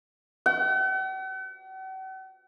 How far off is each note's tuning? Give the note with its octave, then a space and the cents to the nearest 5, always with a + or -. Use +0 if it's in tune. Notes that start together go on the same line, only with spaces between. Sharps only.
F#5 +45